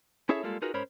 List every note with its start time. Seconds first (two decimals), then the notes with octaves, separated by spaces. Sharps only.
0.29 C#4 E4 G#4 A4 C#5 E5
0.43 G3 G#3 A#3 F4 A4
0.62 D#4 F4 F#4 G#4 A#4 B4
0.74 G#2 C#4 A#4 C5 C#5 B5